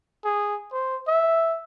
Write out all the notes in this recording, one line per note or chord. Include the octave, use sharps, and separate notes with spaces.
G#4
C5
E5